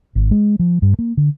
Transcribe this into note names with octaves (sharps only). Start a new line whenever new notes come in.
G#1
G#3
F3
G2
A#3
D3